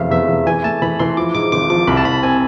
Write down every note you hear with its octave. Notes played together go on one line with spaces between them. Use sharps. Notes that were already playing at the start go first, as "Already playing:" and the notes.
Already playing: F1 E2 E5 F5
E2 E5
E2
E3 G#5
A3 A5
E3 B5
E3 C6
F3 D6
G#2 D6
G#1 D6
F3 D6
C2 B5
A5
C2 B5
C4 G#5